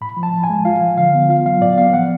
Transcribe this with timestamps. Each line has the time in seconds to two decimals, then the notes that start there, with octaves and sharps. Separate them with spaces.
0.01 A2 B5
0.17 F3
0.23 A5
0.33 A2
0.44 G#5
0.50 G#3
0.65 F4 F5
0.81 F3
0.98 D3 F5
1.14 B3
1.29 F4 F5
1.46 F#3 F5
1.61 A2 D5
1.78 B3 F5
1.94 F3 F#5